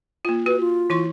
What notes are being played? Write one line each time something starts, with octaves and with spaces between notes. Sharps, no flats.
A#3 F4
F#4 B4
F4
E3 E4 C6